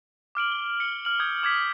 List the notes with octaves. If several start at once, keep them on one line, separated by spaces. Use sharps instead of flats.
D6 F6 D7 F#7
G7
C#7
F6 F#7
D#6 G6 G#6
D6 G#6 B6